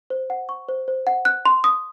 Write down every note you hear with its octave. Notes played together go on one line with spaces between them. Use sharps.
C5
F#5
C#6
C5
C5
F#5
F#6
C6
D#6